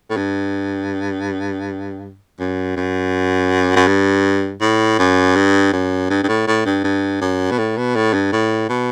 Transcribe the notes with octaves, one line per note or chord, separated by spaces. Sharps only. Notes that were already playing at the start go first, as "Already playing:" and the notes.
A2
G2
F#2
F#2
F#2
G2
A2
F#2
G2
F#2
G2
G2
A2
A2
G2
G2
F#2
B2
A2
B2
A2
G2
A2
B2